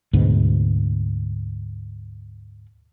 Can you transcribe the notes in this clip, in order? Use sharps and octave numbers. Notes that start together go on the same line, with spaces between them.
D2 G#2 B2